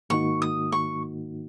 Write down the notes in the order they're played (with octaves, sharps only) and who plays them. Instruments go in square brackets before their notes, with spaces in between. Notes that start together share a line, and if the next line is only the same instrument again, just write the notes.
[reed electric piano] G#2 D#3 A#3 D#4 F#4 [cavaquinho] C#6
[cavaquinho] D#6
C#6